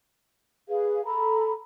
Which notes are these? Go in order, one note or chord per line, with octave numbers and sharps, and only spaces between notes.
G#4 B4 F5
A4 A#5 B5